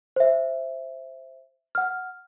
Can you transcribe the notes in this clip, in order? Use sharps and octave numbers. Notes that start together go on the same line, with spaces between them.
C5 E5
F#5 F6